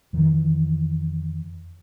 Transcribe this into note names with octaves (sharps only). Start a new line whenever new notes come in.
F2 D#3 E3